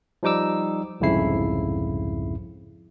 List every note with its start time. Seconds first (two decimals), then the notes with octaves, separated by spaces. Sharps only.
0.23 F3 G3 D#4 D6 E6
1.01 C2 F2 G#2 C#3 E4 C7